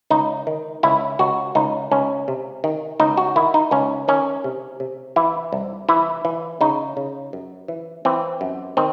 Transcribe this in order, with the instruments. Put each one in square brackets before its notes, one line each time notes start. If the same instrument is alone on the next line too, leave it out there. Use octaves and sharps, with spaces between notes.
[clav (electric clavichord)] C#2 D#4
D#3
C#2 E4
C#2 F#4
C#2 D#4
C#2 C#4
C3
D#3
C#2 D#4
F#4
D#3 E4
D#4
C#2 C#4
D#3 C#4
C3
C3
E3 E4
C2
E3 E4
E3
C#3 D#4
C#3
F#2
E3
E3 C4
F#2
D#3 C4